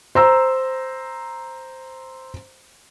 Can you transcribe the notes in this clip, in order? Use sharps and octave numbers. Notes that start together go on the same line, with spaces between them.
C5 A#5 E6